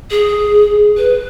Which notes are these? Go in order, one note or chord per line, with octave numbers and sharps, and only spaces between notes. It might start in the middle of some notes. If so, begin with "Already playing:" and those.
G#4
B4